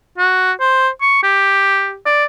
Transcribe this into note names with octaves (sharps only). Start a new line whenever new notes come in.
F#4
C5
C#6
G4
D5